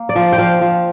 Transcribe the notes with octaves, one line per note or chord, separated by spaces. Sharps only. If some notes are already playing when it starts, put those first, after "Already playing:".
Already playing: A#3
D5
F3
G5
F3 F5
F3